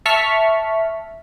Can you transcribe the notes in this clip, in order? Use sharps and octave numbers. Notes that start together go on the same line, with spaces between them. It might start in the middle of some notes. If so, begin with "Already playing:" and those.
E5 A5 C#6 F6 B6